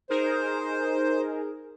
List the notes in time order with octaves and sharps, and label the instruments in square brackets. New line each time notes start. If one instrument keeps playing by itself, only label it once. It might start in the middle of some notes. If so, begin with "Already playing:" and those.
[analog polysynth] D#4 G#4 A#4 [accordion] C5